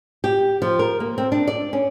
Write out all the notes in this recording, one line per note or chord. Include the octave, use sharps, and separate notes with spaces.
G4
F3
A#4
A#3
C4
D4
D5
C#4